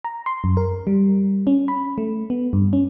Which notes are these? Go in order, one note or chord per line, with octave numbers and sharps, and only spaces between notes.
A#5
C6
F#2
A#4
G3
C#4
B5
A3
B3
G2
C#4